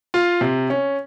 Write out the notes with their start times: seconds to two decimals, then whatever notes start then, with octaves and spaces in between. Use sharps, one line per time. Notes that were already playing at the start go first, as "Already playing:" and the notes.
0.14 F4
0.41 C3
0.70 C#4